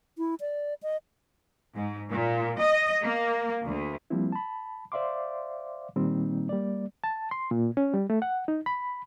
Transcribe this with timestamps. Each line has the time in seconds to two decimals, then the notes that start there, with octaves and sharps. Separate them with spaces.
0.18 E4
0.40 D5
0.83 D#5
1.75 G#2
2.11 A#2
2.61 D#5
3.03 A#3
3.65 D2
4.10 F3 G3 A#3 C4 E4
4.32 A5 B5
4.92 C5 D5 E5 F5 C6 D6
5.96 A#2 D#3 G3 A#3 C4 D#4
6.49 G3 A#3 D5
7.04 A5
7.31 C6
7.51 A#2
7.77 C#4
7.94 G3
8.10 A3
8.22 F#5
8.48 D#4
8.66 B5